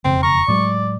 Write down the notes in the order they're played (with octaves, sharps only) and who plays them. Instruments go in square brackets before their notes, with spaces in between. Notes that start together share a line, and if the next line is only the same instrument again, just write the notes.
[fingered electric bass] E1 F2 C#3 [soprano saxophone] C4
[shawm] A#5 [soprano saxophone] C#6
[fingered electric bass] A2 F#3 G#3 [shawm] D5